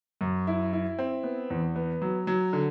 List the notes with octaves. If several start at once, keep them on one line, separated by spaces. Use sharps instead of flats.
F#2
E4
E4
C4
B3
E2
B3
F#3
F#3
D3